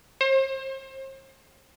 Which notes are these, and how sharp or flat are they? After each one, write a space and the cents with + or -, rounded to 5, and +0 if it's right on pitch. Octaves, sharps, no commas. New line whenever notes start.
C5 +35